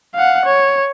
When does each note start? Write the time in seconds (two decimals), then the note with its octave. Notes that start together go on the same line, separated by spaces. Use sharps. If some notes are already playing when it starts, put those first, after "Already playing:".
0.14 F5 F#5
0.45 C#5